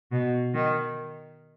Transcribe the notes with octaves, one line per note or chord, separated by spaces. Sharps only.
B2
D#3